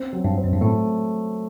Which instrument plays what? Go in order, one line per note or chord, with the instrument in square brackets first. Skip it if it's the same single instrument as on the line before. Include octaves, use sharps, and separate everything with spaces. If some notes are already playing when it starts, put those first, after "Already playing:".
Already playing: [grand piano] C4
F#3
[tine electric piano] G2
[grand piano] C4
[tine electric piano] F#2
G2
[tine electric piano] A2 [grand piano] A3